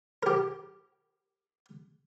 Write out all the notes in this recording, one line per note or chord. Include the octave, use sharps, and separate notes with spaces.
G4 A#4